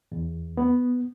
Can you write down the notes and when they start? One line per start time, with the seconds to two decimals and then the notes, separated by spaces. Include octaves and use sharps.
0.12 E2
0.57 B3